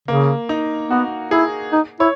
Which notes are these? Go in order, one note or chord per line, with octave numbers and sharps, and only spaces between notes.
C#3 A#3
D#4
B3 F#4
E4 G#4
D#4
E4 C#5